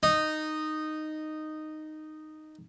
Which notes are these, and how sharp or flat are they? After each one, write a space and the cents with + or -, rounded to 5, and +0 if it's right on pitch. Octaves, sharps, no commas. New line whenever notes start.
D#4 -10